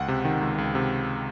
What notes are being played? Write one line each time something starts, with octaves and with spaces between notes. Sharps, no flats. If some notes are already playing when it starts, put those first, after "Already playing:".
Already playing: C#2 F#5
C3
D#3
C#2
C#2
C3